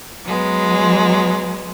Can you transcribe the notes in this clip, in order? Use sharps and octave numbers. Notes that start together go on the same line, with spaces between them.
F#3 G#3 B3